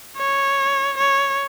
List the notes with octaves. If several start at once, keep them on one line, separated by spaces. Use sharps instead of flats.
C#5
C#5